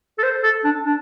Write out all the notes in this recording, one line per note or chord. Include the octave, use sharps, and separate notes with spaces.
A4
C5
A4
D4
D4